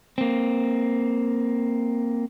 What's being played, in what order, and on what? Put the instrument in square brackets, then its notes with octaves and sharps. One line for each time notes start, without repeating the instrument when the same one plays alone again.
[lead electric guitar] A#3 C4